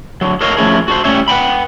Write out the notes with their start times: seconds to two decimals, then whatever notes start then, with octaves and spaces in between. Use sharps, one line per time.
0.21 D3 F#3
0.41 A4 A#4 C#5 D#5 F5
0.57 F3 A3 C4 C#4 E4 G#4
0.88 F#4 A4 C5
1.04 G3 A3 C#4 C#5 E5
1.28 B4 F#5 G5 B5